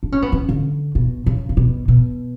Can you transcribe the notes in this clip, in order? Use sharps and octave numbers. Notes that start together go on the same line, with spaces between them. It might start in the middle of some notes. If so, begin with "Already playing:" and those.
D4
C#4
B3
C#4
D3
B2
C#3
C#3
B2
B2